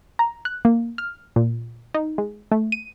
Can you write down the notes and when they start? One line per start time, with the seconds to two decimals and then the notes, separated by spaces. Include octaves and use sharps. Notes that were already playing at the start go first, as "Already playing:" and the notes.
0.19 A#5
0.45 F#6
0.65 A#3
0.98 F6
1.36 A#2
1.94 D#4
2.18 G#3
2.52 A3
2.72 D#7